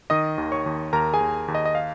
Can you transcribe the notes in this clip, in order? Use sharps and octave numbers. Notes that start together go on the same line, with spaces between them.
D#3 D#5 D#6
D#2
C#5 C#6
D#2
D#2 A#4 A#5
G#4 G#5
D#2
D#2
D#5
D#5
F5